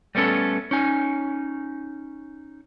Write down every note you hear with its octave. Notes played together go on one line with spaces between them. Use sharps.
G3 A3 B3 C#4 A4
C#4 D#4 G#5